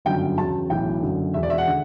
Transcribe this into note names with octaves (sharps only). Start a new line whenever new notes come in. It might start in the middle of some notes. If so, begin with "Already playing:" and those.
G1 F#2 D3 F#3 G5
E2 C#3 F#3 A5
B1 A2 E3 G5
F#1 F#2 D3 F#3
E1 E2 B2 E5
D5
E5
F#5
D3